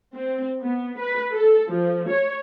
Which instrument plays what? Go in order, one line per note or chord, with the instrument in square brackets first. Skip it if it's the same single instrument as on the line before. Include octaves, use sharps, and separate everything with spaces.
[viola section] C4
B3
B4
A4
F3
C#5